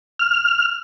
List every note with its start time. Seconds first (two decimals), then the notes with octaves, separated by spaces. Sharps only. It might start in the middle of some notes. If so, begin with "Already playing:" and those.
0.19 F6